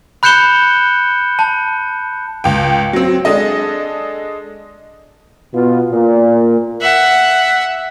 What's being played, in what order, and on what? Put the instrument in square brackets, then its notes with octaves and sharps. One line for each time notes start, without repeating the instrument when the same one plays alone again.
[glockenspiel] B5 F#6 G6 C#7 E7 G7
A5
[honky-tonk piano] C#2 G5
F#3 C4
G#3 D4 A4 D#5
[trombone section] B2 B3 F4
A#2
[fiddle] E5 F#5